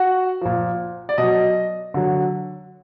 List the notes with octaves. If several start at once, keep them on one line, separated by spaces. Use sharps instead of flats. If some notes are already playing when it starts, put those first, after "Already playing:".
Already playing: F#4 F#5
A#2 F3
D5
B2 F#3 D#5
D3 F#3